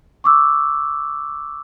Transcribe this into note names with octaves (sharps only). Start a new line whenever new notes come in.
C#6 D6 E6